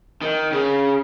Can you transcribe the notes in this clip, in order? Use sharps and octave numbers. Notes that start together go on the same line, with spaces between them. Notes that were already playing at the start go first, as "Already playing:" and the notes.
D#3
C#3